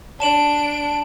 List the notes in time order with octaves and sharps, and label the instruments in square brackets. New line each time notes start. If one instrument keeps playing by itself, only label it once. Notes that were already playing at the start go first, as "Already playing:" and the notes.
[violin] D4 D7 [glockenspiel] A5 E7 F#7